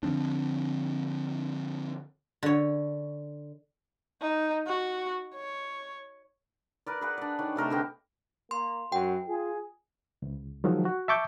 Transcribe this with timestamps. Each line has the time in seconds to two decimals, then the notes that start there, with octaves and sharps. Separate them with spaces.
0.03 D3 F3 C4 D4
2.43 D3 C#5
4.21 D#4
4.66 F#4
5.35 C#5
6.86 A#4 B4 D5
7.01 G#4 B4 F#5
7.18 D4 D5
7.39 D#3 C#5
7.56 C3 A3 A#4 C5
7.70 D3 B3 G4
8.51 A#3 C6
8.92 F#2 F#4 G5
9.28 F4 G#4
10.22 C#2
10.64 D#3 F3 F#3 G#3
10.85 F#4
11.08 E5 A5 C#6 D6 G6